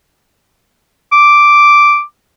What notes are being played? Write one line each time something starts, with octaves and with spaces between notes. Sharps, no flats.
D6